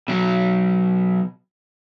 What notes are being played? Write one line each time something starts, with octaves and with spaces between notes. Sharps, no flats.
B2 F#3